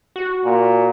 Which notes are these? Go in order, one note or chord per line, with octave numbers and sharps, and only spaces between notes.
F#4
A#2